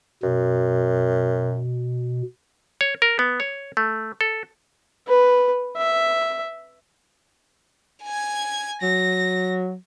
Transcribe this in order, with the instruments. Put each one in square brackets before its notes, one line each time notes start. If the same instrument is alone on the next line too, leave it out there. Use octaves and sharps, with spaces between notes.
[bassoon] F#2 [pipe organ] B2
[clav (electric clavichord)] C#5
A#4
B3
C#5
A3
A4
[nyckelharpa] B4
E5
[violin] G#5 G#6
[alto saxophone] F#3 [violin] A#6